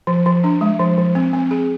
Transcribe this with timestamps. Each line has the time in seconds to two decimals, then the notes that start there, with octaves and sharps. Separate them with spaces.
0.07 F3
0.26 F3
0.44 D4
0.61 G#3
0.79 F3
0.98 F3
1.15 C4
1.33 C4
1.51 G#4